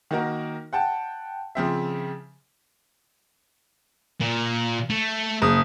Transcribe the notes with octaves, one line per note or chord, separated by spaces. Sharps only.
D#3 A#3 D#4 F#4 A#4
F#5 G5 A5
C#3 F3 C4 E5
A#2
A3
F#1 D#6